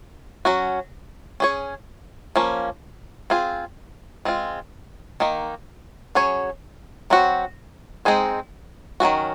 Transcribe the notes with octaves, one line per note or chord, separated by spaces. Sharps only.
F#3 C#4 F#4
C#4 G#4 C#5
F3 A#3 C#4
C4 F4 G#4
G#3 C4 F4
D#3 A#3 D#4
F#3 C#4 G#4 C#5
F#3 C4 F#4
G#3 C4 D#4 G#4 C5
D#3 F#3 A#3 C#4 F#4